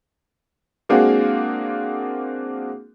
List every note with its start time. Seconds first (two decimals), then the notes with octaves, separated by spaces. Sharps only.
0.89 G#3 A#3 C4 D4 F#4 G#4